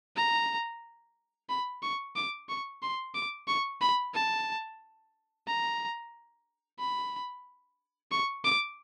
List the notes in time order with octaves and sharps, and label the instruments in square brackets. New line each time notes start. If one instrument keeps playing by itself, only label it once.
[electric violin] A#5
B5
C#6
D6
C#6
C6
D6
C#6
B5
A5
A#5
B5
C#6
D6